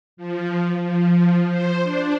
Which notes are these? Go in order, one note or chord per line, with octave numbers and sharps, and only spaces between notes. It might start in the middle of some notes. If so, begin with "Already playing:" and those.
F3
F3
C5
D4